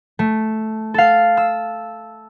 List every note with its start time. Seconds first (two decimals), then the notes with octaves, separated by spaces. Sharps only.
0.19 A3
0.94 A4 F5
1.37 E6